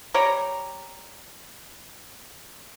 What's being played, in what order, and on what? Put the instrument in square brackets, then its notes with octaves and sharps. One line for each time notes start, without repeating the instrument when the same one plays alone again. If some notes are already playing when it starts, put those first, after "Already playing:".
[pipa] G3 C#5 G5 A#5